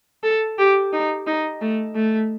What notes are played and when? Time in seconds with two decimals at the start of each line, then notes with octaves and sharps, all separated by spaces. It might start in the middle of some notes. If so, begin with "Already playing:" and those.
0.23 A4
0.58 G4
0.93 D#4
1.27 D#4
1.61 A3
1.95 A3